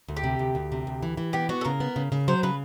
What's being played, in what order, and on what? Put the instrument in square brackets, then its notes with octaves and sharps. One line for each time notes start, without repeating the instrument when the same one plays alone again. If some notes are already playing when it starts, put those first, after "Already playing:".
[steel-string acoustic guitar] D2
[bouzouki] G4
[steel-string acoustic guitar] C3
D2
D2
C3
D2
E3
E3
[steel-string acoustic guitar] B3 [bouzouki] G4
[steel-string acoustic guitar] B3 [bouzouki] F#4
[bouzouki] A4
[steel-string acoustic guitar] C#3 [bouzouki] A#4
[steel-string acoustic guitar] B3
C#3
C#3
[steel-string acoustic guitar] F#3 [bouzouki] C5
[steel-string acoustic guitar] C#3 [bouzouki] B4